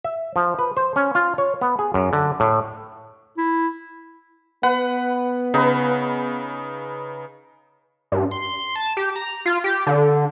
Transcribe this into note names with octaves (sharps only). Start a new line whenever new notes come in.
E5
F3
B4
C5
C#4
F4
C#5
B3
G#4
F#2
D3
A2
E4
B3 B4 F#5
C#3 D#4 B4
G2
C6
A5
G4
A#5
F4
G4
D3